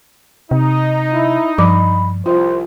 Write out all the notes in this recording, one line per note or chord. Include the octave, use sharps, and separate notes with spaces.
C3 D#4
E4
G2 F3 B5 D6
C2 F4 C5